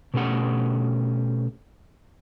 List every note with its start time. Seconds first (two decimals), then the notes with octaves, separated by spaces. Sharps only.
0.14 B2 A3 C#4 G4 F#5